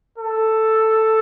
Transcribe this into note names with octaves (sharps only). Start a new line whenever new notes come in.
A4